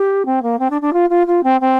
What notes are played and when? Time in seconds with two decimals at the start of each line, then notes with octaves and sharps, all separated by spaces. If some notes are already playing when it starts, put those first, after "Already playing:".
Already playing: G4
0.26 C4
0.43 A#3
0.59 C4
0.70 D4
0.82 D4
0.93 F4
1.10 F4
1.27 F4
1.44 C4
1.61 C4